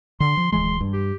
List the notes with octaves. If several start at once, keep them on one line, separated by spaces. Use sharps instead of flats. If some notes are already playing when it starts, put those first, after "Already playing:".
D3 C6
F3
D1 E3 G#3 C6
G2
G4